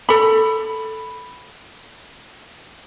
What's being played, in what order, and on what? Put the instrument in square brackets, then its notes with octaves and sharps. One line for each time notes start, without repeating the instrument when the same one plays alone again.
[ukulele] A4 B5